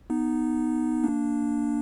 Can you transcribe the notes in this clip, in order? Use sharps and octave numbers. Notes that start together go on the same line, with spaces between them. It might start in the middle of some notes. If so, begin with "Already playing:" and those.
B3 D#4
A#3 D4